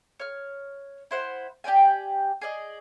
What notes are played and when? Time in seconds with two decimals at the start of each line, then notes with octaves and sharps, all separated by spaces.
0.20 C#5 F6
1.11 E4 C5 F#5
1.64 G4 D5 G5 G#5
2.41 G#4 D5 D#5